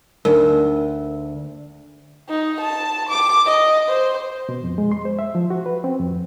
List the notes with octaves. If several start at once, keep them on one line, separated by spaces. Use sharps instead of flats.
D2 D#4 A#4
D#4
A5
D6
D#5
C5
B2
F2
G#3
C6
C5
E5
F3
F#4
B4
C4
F2